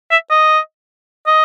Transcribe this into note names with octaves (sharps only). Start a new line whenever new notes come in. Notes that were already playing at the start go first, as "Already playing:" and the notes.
E5
D#5
D#5